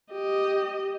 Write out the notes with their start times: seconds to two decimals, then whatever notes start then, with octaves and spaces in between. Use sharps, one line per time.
0.12 G4 D#5